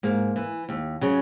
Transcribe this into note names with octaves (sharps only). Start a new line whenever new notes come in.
G#2 A#3
E3
D#2
C#3 F#3